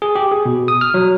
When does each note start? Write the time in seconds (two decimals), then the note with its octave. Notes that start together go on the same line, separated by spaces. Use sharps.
0.02 G#4
0.16 G4
0.31 G#4
0.45 B2
0.68 D#6
0.81 F6
0.94 F#3